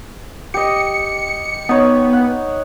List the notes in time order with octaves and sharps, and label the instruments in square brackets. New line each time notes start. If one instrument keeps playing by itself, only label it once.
[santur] G4 D#5 [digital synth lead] C#7
[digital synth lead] B3 [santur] D#4 C#5
[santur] F#5